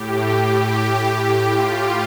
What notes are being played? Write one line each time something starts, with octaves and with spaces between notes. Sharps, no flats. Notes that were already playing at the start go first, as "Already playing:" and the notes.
Already playing: A2 G4
G4
G4
F4